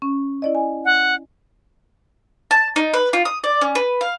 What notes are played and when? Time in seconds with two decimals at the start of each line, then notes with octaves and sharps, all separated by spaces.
0.02 C#4
0.42 E4 D5 D#5
0.55 G#5
0.85 F#5
2.51 A5
2.76 D#4
2.94 B4
3.13 F4
3.25 D#6
3.44 D5
3.61 C#4
3.75 B4
4.01 F5